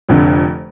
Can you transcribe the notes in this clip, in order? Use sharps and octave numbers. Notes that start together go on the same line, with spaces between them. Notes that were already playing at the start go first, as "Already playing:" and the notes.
F1 F2 D3